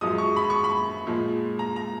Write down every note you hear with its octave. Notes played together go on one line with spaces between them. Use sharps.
F#2 F3 G#3 D#6
C#6
B5
C#6
B5
A#2 F3 G#3
A#5
A#5